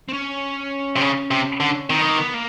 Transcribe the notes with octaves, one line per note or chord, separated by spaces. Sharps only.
C4
C#4
C3
C#3
C3
D3
D#3 C4
B3
A#3
B3
A#3